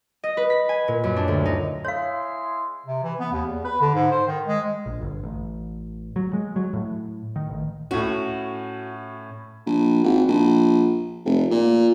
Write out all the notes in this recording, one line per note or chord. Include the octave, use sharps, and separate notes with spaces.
D#5
B4
B6
G#5
A#2
F#2
D4
D2
D#4
G#3 E4 C#5 F5 C6
C3
E3
B3
D#2
E2
B4
D3
G#2
C5
D#3
G#3
A#1
G1
A1
F#3
G#3
F#3
A2
D#3
A1
A2 C#4 F#4
A#1
G#1
A#1
F1
A#2